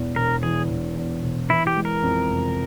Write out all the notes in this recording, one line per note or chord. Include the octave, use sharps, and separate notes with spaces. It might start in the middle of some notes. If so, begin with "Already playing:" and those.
Already playing: E1 E2 E3
E1 A#4
E3 G#4
E1
E2
E1
E3 E4
G4
G#3
A#4
F2
F1